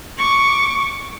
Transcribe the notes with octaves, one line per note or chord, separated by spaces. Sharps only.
C#6 D6